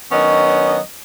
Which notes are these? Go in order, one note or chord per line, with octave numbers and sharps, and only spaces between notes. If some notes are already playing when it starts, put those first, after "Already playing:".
D#3 F#3 B3 C#4 D4 D#5